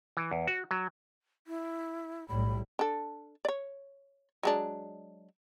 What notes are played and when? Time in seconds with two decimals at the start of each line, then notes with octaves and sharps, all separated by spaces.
0.17 E3
0.31 E2
0.47 F#4
0.71 F#3
1.47 E4
2.29 B1 A2 G3 B5
2.79 D4 A4
3.45 C#5 D5
4.43 F#3 G#3 D4